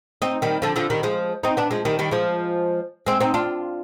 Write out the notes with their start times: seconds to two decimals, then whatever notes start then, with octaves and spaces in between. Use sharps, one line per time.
0.22 C4 D#4
0.42 D#3 G3
0.62 D3 F3
0.76 D3 F3
0.90 D#3 G3
1.03 F3 G#3
1.43 C4 D#4
1.57 B3 D4
1.71 F3 G#3
1.85 D#3 G3
1.99 D#3 G3
2.11 F3 G#3
3.06 G#3 C4
3.21 C4 D#4
3.34 D4 F4